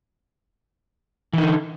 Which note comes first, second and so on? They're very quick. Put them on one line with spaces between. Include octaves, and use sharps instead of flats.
E3 D#4 D3